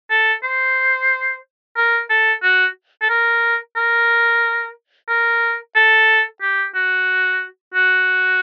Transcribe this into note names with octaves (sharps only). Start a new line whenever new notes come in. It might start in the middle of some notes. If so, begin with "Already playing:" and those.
A4
C5
A#4
A4
F#4
A4
A#4
A#4
A#4
A4
G4
F#4
F#4